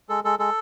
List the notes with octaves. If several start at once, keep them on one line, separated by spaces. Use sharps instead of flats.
G#3 A4
G#3 A4
G#3 A4